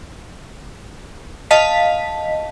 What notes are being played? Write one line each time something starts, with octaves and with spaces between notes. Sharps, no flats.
D#5 F5 A5 B6